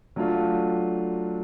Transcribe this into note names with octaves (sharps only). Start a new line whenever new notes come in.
F#3 A3 D4 F4